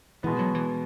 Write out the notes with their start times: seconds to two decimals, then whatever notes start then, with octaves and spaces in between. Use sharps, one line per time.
0.23 B2 E3 G#3 B3
0.39 F#3
0.54 E3